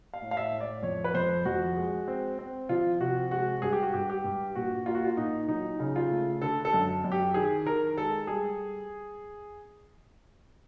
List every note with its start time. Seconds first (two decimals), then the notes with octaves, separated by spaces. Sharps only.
0.14 F5
0.22 A2
0.31 F5
0.37 E5
0.52 A2
0.60 D5
0.83 F2 C#5
1.04 B4
1.14 F2 C5
1.45 F2 F#4
1.76 G#3
2.08 C4
2.39 C4
2.69 F3 F4
3.00 C3 F#4
3.31 G#3 F#4
3.62 G2 G#4
3.73 G4
3.83 F#4
3.94 G2 G4
4.10 G4
4.24 G2
4.55 A#2 F#4
4.86 A#3 F4
4.95 F#4
5.05 F4
5.17 A#2 D#4
5.48 F#3 D#4
5.79 C#3
5.96 F4
6.10 A3
6.42 D3 A4
6.65 A4
6.73 F#2
7.04 F#2
7.12 G4
7.34 D#3 G#4
7.65 D#3 A#4
7.97 G#3 A4
8.27 G3 G#4